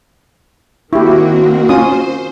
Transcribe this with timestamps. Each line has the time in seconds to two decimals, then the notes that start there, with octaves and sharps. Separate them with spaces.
0.93 D#3 A#3 C4 E4 F#4 G4
1.69 C#4 F4 C5 D#6